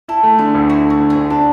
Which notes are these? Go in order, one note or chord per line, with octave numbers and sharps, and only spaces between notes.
E4 A4
A3
D3 G#4
D2
E4 F#4
A3
F#4
D3
G#4
D2
D4 A4